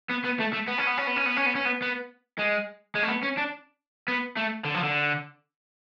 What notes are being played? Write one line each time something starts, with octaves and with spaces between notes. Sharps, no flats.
B3
B3
A3
A3
B3
C#4
B3
C#4
B3
C#4
B3
C#4
B3
C#4
B3
B3
G#3
G#3
A3
B3
C#4
D4
B3
A3
D3
F3
D3